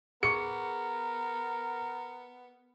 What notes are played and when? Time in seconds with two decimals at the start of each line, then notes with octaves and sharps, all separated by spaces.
0.23 B3 G#4 A#4 C#6 C#7